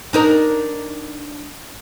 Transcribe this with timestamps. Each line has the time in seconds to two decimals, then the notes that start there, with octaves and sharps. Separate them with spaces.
0.13 D4 D#4 A#4